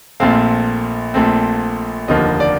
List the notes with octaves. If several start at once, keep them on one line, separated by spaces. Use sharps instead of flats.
A#1 A#2 A3 C4 F5
A#1 A#2 A3 C4
F1 D#2 D3 F3 A#3 D#5
D5